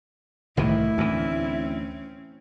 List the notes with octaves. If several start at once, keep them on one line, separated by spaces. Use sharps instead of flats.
C2 A2 D#3 E3 E4
D2 E3 C4 C#4